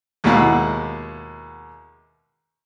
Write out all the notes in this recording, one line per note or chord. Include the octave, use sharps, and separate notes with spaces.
D#2 B2 G#3 E4 F#4 F5